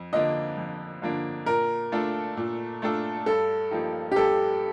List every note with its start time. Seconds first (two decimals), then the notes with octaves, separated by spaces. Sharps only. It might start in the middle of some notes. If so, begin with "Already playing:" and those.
Already playing: F2
0.13 D3 F3 A#3 D4 D#5
0.57 F2
1.02 D3 F3 A#3 D4
1.46 A#2 A#4
1.92 A3 D4 F4 A4
2.37 A#2
2.82 A3 D4 F4 A4
3.26 G2 A4
3.71 F3 A#3 D#4 G4
4.12 G4
4.16 G2 A4